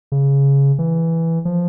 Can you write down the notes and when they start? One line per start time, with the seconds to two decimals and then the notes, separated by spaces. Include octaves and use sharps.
0.12 C#3
0.79 E3
1.45 F3